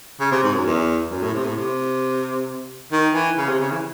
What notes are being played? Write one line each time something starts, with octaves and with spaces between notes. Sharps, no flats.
C#3
C3
G#2
F#2
E2
F#2
A2
C3
A2
C3
D#3
E3
C#3
C3
C#3
E3